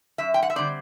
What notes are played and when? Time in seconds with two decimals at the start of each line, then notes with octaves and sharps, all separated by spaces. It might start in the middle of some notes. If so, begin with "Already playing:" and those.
0.18 F#2 E5
0.34 G5
0.42 F#5
0.50 E5
0.56 D3 G3 C4 D5